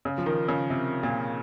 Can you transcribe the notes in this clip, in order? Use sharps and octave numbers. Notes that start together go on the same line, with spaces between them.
C#3
F3
D#3
C#3
C3
A#2